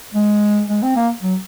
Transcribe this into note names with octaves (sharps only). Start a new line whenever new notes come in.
G#3
G#3
C4
A#3
F#3